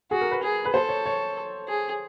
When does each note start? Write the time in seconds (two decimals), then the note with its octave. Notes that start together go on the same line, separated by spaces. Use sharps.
0.11 F#4 G#4
0.21 A#4
0.31 B4
0.43 G#4
0.65 B4
0.74 A4 C5
0.89 C#5
1.06 C#5
1.68 G#4